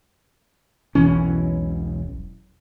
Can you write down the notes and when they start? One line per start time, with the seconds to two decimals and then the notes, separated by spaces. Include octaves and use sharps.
0.95 E1 B1 E3 C#4